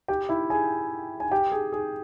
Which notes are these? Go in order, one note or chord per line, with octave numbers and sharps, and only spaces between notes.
G4 G5
E4 E5
G#4 G#5
G#5
G4 G5
G#4
G#4